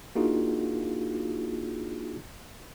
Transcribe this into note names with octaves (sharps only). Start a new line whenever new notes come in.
A#3 D4 D#4 F4 F#4 G#4